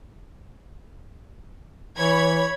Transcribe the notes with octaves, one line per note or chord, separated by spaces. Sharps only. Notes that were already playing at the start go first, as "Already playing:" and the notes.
E3 C#5 B5 G#6